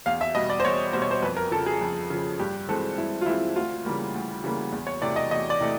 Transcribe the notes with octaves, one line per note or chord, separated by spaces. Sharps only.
E2 F5
E5
B2 G3 D#5
D5
C5
E2 C#5
B2 G3 C5
C#5
C5
F2 B4
A#4
C#3 F3 A4
G#4
F2
C#3 F3
G2 G4
E3 G#3 C4 A4
G2 E4
F4
E3 G#3 C4 E4
D2 F4
C#3 E3 G3 A#3
D2
C#3 E3 G3 A#3
E2
C#5
C3 E3 A3 D5
D#5
E2 D#5
D5
C3 E3 A3